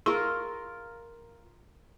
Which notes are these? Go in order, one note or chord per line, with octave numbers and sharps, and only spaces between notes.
F4 G#4 A#4 C6 C#6